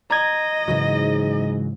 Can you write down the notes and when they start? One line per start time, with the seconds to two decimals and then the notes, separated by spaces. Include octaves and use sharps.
0.11 D#5 A#5 G#6
0.68 G#2 C#3 E3 F#3